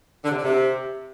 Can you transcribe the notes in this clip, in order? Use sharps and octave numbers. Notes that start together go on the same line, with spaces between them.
D3
C3
D3
C3